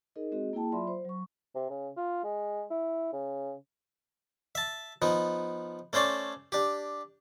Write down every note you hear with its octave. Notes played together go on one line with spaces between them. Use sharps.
D#4 G#4 A#4 D#5
G#3 C4 F#4 G#4 D#5
A#3 E4 G#4 G5 A5
F#3 F4 D5 E5 B5 C6
C5
F#3 C#6
C3
C#3
F4
G#3
E4
C#3
E5 A5
F3 B3 D#4
A3 C#4 C5 D5 A5
D4 G4